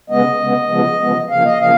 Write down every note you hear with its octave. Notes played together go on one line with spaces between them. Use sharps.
C#3 G#3 B3 D#5
C#3 G#3 B3
C#3 F3 G#3 B3
C#3 F3 G#3 B3
C#3 F3 A#3 F5
D#5
C#3 F3 A#3 F5